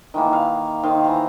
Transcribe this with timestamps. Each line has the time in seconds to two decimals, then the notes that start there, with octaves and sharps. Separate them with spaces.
0.14 D#3 E3 A#3
0.33 F5
0.83 D#3 C5 F5
1.04 E3 A#5